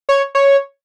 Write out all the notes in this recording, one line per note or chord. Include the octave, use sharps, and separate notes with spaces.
C#5
C#5